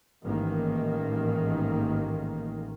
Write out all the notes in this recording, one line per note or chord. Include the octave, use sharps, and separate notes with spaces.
A1 G#2 D#3 A#3